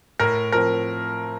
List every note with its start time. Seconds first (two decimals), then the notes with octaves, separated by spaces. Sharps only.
0.20 A2 A#4
0.52 F3 C4 A#4